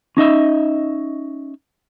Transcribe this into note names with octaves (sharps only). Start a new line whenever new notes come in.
C#4 D#4 D#5 E5